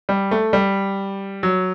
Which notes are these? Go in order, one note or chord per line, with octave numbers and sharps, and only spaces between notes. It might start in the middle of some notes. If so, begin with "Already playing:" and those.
G3
A3
G3
F#3